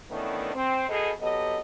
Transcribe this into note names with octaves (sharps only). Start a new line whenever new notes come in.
D#3 E3 A3 B3 C#4 D4
C4
B2 G#4 A4 D#5
F#3 B3 G4 A4 D#5